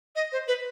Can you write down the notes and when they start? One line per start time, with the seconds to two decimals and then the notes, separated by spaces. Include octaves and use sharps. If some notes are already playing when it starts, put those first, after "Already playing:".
0.15 D#5
0.32 C5
0.48 B4